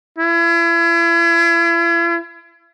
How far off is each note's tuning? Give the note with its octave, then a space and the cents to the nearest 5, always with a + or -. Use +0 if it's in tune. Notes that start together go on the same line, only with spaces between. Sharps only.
E4 +40